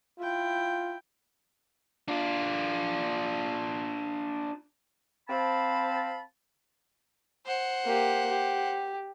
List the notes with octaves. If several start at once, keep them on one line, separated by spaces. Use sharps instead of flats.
E4 F4 G5
D4 F4
C4 F5 A5 B5
C5 F#5
A#3 G4
G4